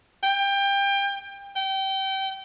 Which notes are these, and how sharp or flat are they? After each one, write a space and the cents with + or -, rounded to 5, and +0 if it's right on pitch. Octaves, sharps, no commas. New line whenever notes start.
G5 +25
G5 -25